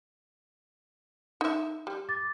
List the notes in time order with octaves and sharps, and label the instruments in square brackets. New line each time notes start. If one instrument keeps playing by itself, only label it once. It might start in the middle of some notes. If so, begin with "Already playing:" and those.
[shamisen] D#4 E5
G3
[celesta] D6 A6